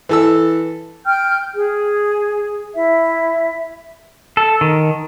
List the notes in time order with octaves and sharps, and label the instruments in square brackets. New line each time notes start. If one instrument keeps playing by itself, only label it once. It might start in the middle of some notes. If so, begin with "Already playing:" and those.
[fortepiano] E3 A4 E6
[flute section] G5 F6 G6
G#4
E4 E5
[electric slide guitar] A4
D#3